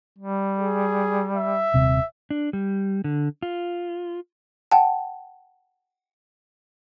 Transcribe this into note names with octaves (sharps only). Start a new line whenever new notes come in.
G3
G#4
E5
D#1 C3
D4
G3
D3
F4
F#5 G5 A5